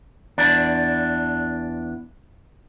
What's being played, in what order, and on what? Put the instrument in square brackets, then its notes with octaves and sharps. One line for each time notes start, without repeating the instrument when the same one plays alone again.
[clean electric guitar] E2 D4